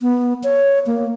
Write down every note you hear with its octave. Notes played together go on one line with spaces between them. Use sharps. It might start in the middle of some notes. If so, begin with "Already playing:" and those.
B3
C#5
A#3